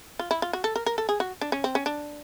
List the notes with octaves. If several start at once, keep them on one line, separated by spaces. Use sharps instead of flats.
F4
E4
F4
F#4
A4
A#4
A#4
A4
G#4
F#4
D4
C#4
C4
C#4
D4